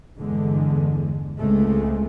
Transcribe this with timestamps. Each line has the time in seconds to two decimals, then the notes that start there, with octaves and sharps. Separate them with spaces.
0.18 E2 G2 D3 G#3
1.37 C#2 G#3 A3 C4